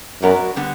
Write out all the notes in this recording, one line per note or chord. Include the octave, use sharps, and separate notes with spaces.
F#2 F#3 B3 D4 F#4 A#4
D3 G3 B3